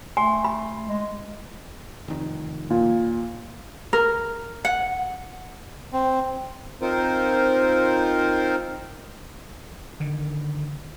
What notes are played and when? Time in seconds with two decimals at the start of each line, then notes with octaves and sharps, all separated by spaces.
0.17 A3 G#5 C6
0.44 B5
0.88 G#3
2.08 F1 D#3
2.70 A#2
3.93 A#4
4.65 F#5
5.93 C4
6.82 C4 D#4 F4 A#4 C5
10.00 D3 D#3